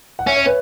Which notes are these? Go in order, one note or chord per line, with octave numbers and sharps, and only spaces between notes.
F#5
C#4 E5
C#5
B4